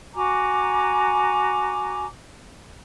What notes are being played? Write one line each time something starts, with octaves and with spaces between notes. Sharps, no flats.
F#4 G#5 A#5 D6